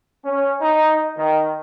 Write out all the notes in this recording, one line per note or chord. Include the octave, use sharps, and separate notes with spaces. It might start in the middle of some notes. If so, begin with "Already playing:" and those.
C#4
D#4
D#3